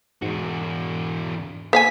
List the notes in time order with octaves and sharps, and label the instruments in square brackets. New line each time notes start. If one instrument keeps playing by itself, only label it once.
[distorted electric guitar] E2 F#4 [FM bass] G#2
[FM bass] A#3 [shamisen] C5 F5 G#5 [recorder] B6